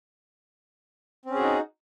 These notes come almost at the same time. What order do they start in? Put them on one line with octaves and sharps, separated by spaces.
C4 C#4 G#4 F#4 D#4